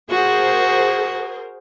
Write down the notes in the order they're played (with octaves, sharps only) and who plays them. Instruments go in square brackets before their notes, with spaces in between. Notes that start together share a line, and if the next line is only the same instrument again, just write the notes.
[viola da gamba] F#4 [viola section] G#4 A#4 C5